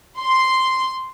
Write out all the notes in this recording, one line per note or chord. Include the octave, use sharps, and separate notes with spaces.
C6